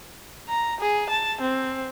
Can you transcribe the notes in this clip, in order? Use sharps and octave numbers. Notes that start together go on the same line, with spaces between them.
A#5
G#4
A5
C4